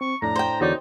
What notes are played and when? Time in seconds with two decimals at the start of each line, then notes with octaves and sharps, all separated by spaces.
0.01 C4 C#6
0.22 F2 A2 D4 A#5
0.36 C5 G5
0.61 E2 D3 D#4 F#4 C#5 D5